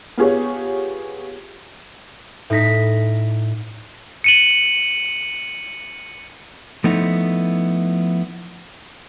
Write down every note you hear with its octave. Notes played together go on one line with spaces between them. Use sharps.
B3 F4 G4 G#4 C#5
A2 D#4 A#6 B6
C#7 D#7 F#7
F3 A3 B3 D#4 E4